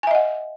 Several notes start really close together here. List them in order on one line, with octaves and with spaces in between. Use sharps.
G#5 E5 D#5 F#5